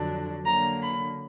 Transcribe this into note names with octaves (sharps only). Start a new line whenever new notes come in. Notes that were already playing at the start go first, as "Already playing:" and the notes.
Already playing: F2 D3 F#3 D4
D3 F#3 A#3 A#5
B5